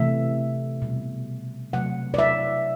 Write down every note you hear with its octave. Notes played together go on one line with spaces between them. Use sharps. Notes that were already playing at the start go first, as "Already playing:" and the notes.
Already playing: C3 E3 A3 E5
B2 G3
C3 F#3 A3 F#5
D5
E5